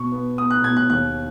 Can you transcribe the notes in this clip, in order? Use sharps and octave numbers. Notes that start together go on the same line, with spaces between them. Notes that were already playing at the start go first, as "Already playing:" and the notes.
Already playing: B2 C#6
B3
B3 D#6
F#6
B2 G#6
F#6
D#2 F#6